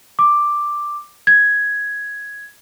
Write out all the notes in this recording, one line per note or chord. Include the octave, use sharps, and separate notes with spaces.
D6
G#6